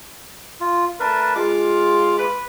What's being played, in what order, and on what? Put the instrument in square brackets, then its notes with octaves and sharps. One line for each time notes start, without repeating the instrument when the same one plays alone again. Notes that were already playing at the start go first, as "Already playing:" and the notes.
[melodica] F4
[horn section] A3 D4 A5 [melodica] A#4 B4
[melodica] G#3 D6 [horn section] F4
[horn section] B4